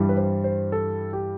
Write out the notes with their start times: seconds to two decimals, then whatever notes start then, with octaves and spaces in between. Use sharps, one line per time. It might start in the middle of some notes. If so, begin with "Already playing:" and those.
Already playing: G2 E3 G3
0.09 B4
0.17 C5
0.44 C5
0.72 A4
1.13 G4